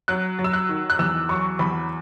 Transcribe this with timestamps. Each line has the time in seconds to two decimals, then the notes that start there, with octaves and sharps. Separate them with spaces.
0.08 F#3 F#6
0.39 F#3
0.44 E6
0.53 F#6
0.69 D#3
0.90 F#6
0.99 E2 E6
1.29 F#3 C#6
1.59 E2 B5